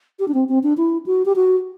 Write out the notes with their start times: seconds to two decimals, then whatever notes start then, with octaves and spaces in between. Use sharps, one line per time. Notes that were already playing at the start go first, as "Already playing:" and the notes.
0.19 G4
0.28 D4
0.34 C4
0.49 C4
0.63 D4
0.77 E4
1.06 F#4
1.25 G4
1.36 F#4